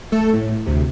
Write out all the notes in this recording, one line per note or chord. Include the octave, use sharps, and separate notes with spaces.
A3 A4
A2
D2 C3